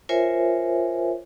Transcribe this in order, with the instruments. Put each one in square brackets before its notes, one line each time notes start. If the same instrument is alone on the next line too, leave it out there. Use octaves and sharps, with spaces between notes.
[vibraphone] F4 A#4 C5 C#5 E5 G#5